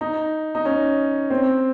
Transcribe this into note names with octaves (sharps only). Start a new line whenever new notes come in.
D#4
D#4
C#4
C4